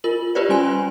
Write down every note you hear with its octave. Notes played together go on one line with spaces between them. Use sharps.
F4 A#4 F#7
F4 G4 B4 C5 D5
G3 C#4 G#5 C6